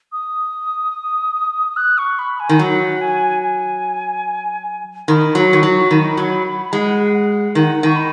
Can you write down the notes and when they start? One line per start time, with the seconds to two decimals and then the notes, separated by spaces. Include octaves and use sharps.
0.12 D#6
1.77 F#6
1.98 C#6
2.19 B5
2.40 G#5
2.49 D#3
2.59 F#3 F#5
3.01 G#5
3.42 G#5
5.08 D#3 B5
5.35 F#3
5.49 D#3 C#6
5.63 F#3
5.91 D#3 B5
6.17 F#3
6.73 G#3 F#5
7.14 F#5
7.55 D#3 F#5
7.83 D#3 C#6
7.96 B5